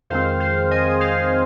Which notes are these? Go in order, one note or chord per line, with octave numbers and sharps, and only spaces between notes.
F2 D#3 G#3 C4 C5 F5
C5 F5
D#5 G#5
C5 F5